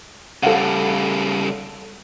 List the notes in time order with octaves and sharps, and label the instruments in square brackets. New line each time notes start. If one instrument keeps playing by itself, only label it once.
[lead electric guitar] C#3 G3 [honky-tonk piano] A4 F5 F#5